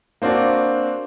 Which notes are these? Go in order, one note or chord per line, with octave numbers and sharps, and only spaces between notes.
A#3 C4 D4 F#4